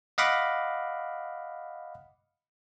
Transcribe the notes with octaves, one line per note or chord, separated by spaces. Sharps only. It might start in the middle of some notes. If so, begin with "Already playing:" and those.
D#5 F5 F#5 B5 D6